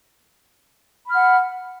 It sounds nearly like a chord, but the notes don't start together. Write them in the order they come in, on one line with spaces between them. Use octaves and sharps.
B5 F6 F#5